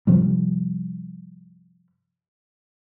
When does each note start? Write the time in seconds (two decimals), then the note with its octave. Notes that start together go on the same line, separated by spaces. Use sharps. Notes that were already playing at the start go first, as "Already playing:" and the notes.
0.07 G2 C3 F3 G3